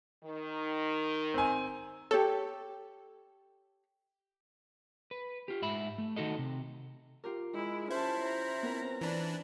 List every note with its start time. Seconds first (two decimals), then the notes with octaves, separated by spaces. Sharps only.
0.24 D#3
1.34 C4 G#5
2.11 G4 A4 C#5
5.11 B4
5.48 F4 G4
5.62 G#2 E5 B5
5.98 A3
6.16 D#3 D#4 F#4 A4 D#5
6.39 C3
7.24 F4 G4 A#4
7.54 G#3 E4
7.91 C#4 E4 C5 A5
8.20 C#4 A#5
8.62 B3 C4 A#4
9.01 E3 D4 E5 B5